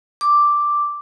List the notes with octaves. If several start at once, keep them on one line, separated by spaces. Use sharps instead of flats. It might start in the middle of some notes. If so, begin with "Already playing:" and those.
D6